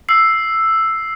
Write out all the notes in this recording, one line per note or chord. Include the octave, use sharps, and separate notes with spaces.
E6 C7